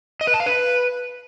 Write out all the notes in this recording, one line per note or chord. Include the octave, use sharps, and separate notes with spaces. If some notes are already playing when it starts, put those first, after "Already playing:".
D#5
B4
A5
F5
B4